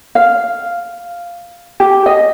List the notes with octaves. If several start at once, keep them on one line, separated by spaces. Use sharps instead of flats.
F5
G4
D#5